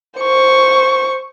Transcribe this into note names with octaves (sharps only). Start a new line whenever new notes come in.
C5 C#6